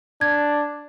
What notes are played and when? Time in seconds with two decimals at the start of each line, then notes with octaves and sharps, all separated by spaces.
0.21 D4 G#6